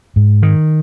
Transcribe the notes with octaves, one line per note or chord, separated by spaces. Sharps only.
G#2
D#3